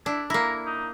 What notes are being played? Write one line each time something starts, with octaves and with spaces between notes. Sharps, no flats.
D4 E4
A#3 E4 A#5
D#4